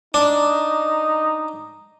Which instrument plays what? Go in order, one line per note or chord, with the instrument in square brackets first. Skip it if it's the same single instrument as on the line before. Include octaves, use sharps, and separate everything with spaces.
[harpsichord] D4 [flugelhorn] D#4